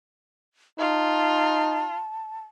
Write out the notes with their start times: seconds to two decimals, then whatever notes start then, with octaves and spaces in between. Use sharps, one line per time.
0.79 D#4 F4 A5